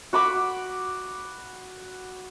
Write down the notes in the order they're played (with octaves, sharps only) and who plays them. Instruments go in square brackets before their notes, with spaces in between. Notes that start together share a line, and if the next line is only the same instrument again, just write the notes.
[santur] F#4 B5 D6